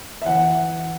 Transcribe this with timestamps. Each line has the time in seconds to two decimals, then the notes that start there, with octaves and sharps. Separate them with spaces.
0.22 E5
0.26 E3 F#5